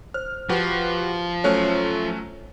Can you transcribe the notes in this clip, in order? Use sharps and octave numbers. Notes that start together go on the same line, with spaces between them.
C5 F6
F3 F#4 G4 B4
F#3 A3 C#4 C5 C#5